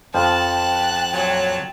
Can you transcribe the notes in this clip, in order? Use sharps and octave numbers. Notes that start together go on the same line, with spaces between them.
F2 F3 G5 A5 F#6
A#2 F#3